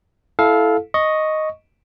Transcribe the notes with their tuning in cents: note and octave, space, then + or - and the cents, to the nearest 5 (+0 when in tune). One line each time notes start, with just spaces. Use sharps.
E4 +0 A4 -15 F5 +10
D#5 +0 C#6 +0